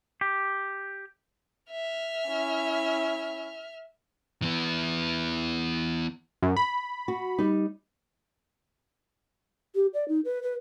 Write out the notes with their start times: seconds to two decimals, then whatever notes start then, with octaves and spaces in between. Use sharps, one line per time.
0.21 G4
1.71 E5 F6
2.28 C#4 E4
4.42 E3 B3
6.43 F#2
6.57 B5
7.08 F#4
7.38 G3 D#4
9.75 G4
9.93 D5
10.08 D#4
10.25 B4
10.43 B4